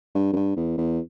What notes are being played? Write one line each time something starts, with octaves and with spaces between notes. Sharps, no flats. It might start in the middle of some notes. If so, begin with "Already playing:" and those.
G2
F#2
G2
E2
E2